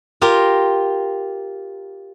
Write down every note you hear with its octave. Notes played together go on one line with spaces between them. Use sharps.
F4 G4 A#4